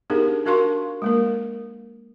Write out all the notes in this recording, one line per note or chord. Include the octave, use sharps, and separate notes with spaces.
B3 D4 D#4 G4 G#4 A#4
D4 F#4 A#4 F5 C6 C#6
G#3 A#3 A#4